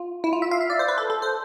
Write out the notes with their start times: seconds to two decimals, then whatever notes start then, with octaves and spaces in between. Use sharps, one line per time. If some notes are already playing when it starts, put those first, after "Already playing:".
Already playing: F4
0.24 E4
0.33 F4
0.42 E5
0.51 F5
0.61 E5
0.70 D5
0.79 C5
0.88 B4
0.98 A4
1.10 A4
1.22 C5